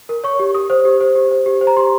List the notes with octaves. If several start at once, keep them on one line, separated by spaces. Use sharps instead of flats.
A#4
C#5 C#6
G4
G4 D#6
C5
G4
C5
G4
C5
G4
C5
A#5
G4 C6